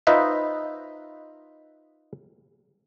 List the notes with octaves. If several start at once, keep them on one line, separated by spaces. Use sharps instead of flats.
D#4 F4 B4 C5 D#5 E5